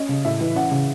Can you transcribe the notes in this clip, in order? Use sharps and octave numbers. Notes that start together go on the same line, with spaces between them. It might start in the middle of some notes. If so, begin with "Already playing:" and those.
Already playing: C#4 D#5
C#3
A2 E5
E3
C#4 F#5
C#3